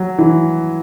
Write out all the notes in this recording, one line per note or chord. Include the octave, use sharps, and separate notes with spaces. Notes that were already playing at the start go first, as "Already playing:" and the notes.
Already playing: F#3
E3